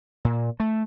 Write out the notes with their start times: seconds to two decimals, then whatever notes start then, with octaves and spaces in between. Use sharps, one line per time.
0.25 A#2
0.60 A3